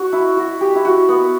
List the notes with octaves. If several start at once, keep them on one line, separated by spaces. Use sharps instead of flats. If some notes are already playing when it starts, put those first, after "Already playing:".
Already playing: F#4
E4
F#4
G4
E4
F#4
B3